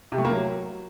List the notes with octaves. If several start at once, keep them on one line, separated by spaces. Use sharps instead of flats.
C3
A3
A#3
F#3